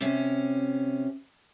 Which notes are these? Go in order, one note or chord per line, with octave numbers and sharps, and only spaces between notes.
C3 C#4